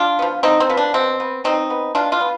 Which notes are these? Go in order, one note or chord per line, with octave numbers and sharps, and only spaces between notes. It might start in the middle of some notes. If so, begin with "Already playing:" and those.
Already playing: D4 F4
F3 B3
D3 C4 D#4
C4
F3 B3
D4
B2 C4
B3
B2 C4 D#4
B3
B2 D4 F4
D4 F4
B3